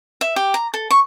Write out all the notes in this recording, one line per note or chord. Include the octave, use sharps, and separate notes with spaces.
E5
G4
A#5
A4
C#6